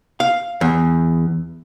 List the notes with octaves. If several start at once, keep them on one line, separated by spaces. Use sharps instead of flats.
F5
E2